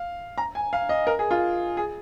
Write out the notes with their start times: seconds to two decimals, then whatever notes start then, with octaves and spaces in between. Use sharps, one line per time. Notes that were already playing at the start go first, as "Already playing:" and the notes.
Already playing: F5
0.38 A#5
0.55 G#5
0.73 F5
0.89 D#5
1.07 A#4
1.19 G#4
1.31 F4
1.77 G#4